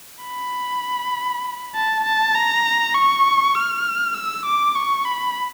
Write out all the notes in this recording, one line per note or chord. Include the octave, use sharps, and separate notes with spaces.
B5
A5
A5
A#5
C#6
F6
E6
D6
C#6
B5